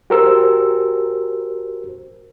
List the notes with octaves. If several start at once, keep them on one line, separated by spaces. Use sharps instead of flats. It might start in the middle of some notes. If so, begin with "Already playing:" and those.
F#4 G4 A#4 C5 E6